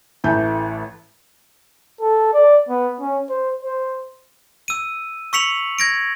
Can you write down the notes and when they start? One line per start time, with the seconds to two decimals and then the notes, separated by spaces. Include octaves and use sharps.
0.24 A1 E3 A3 G6
2.01 A4
2.34 D5
2.69 B3
3.00 C#4
3.29 C5
3.63 C5
4.68 E6 D#7
5.33 C#6 E6 B6 C#7 F7 F#7
5.79 G#6 A#6 D7